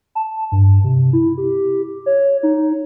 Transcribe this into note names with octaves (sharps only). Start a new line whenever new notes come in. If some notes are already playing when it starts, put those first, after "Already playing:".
A5
G2
C3
E4
G4
C#5
D#4